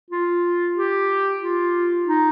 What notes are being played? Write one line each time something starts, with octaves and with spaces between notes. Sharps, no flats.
F4
G4
F4
D#4